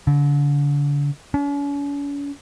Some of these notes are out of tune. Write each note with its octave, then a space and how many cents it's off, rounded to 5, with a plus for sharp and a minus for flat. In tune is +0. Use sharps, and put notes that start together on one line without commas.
D3 -35
C#4 +45